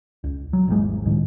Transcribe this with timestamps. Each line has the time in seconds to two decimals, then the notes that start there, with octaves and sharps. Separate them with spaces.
0.24 C#2
0.53 F#3
0.68 G#1 E2 D#3 G#3
1.06 C#2 A2 D#3